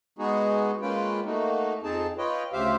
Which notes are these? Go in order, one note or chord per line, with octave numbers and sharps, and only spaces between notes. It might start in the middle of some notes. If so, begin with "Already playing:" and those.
G#3 B3 D#4 F#4 G#4
G#3 A#3 C#4 F4 B4 G5
A3 A#3 D#4 F#4
F2 C4 D#4 G#4 A5
F4 B4 C#5 D#5 G5
D2 C#3 G4 C5 E5 F5